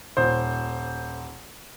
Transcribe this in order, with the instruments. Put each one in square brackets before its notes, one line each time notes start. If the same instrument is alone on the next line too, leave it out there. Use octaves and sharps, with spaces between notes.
[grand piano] D#1 C5